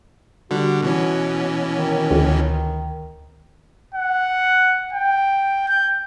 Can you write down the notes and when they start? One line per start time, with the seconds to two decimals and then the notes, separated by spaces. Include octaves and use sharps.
0.51 D3 G3 F#4
0.82 B2 E3 C#4
1.74 D#3
2.11 D2
3.95 F#5
4.93 G5
5.68 G6